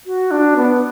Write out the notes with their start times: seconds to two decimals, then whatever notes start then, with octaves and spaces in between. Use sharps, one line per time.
0.06 F#4
0.31 D4
0.57 B3